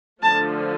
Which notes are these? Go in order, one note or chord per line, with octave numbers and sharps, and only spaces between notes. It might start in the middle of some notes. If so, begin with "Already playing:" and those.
D3 F3 A3 A5